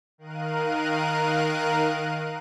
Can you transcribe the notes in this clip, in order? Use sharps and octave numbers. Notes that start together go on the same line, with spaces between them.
D#3 A#4 F5 F#6 D#7